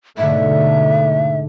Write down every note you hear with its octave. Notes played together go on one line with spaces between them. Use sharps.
G#2 B2 D3 A3 E5